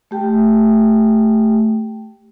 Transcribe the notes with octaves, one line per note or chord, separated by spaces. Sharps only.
A3 G4 G5